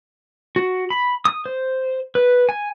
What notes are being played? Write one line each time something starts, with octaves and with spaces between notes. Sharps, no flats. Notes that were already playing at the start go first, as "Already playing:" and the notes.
F#4
B5
D#6
C5
B4
G#5